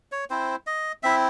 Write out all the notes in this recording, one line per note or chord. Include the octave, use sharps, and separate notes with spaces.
C#5
C4 E4 C5
D#5
C4 E4 E5